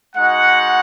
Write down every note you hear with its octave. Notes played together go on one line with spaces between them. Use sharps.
G#3 D#4 F#4 F#5